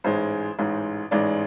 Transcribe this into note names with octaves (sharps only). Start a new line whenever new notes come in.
A1 G#2 G#3 C5
A1 G#2 G#3
A1 G#2 G#3 D5